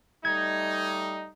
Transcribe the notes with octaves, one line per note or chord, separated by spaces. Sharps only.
G3 A3 D#4 G#6